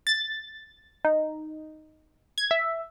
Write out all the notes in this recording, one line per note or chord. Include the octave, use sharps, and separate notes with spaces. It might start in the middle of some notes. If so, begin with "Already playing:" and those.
A6
D#4
G#6
E5